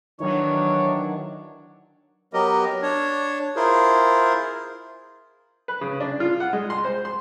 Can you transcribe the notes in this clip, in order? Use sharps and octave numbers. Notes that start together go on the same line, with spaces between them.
D#3 E3 F#3 D4 C#5
F#3 B3 G4 A#4 D#5
D4 C#5
E4 F4 G#4 A#4 C5
B4
C#3
D4
F4
F#5
G#3
C6
C5
C6